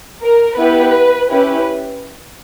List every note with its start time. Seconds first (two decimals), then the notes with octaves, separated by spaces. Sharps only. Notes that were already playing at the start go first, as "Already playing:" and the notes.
0.23 A#4
0.58 B3 E4 G4 B4
1.29 C#4 E4 G4 B4